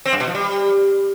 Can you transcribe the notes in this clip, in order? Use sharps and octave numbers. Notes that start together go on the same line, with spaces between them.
C4
F#2
B2
F3
G3